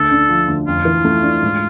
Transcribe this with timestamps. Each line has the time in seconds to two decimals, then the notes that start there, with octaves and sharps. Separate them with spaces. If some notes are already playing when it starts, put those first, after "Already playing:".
Already playing: D2 A4
0.11 D3
0.29 F3
0.48 D2
0.67 F2 F4
0.85 E3
1.05 A3
1.23 D4
1.43 G#2